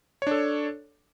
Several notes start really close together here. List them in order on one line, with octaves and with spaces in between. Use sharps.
C#5 D4 A4